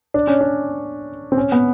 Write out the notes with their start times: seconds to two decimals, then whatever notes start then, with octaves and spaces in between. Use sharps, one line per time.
0.14 D4
0.27 C#4
0.41 D4
1.32 C4
1.37 C#4
1.52 B3